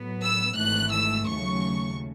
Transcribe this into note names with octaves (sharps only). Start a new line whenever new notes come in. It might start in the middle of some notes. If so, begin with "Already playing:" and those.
Already playing: A2 F#3 B3
E6
G#1 G#2 E3 A3 F#6
E6
D#2 C#3 F#3 A3 C#6